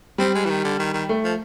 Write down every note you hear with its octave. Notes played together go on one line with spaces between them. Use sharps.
G3 C4
G#3
E3
D#3
D3
D#3
D#3
A3
F3